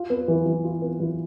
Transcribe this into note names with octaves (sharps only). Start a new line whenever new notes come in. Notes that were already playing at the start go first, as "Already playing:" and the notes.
Already playing: F4
B3
E3
E3
F4
B3
E3